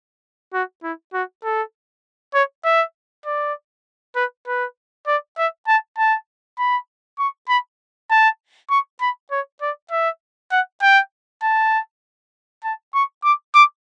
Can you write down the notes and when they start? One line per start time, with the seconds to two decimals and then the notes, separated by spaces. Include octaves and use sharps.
0.54 F#4
0.83 E4
1.13 F#4
1.44 A4
2.34 C#5
2.65 E5
3.26 D5
4.16 B4
4.47 B4
5.07 D5
5.38 E5
5.67 A5
5.98 A5
6.59 B5
7.19 C#6
7.49 B5
8.10 A5
8.70 C#6
9.01 B5
9.31 C#5
9.61 D5
9.91 E5
10.51 F#5
10.82 G5
11.43 A5
12.64 A5
12.94 C#6
13.24 D6
13.54 D6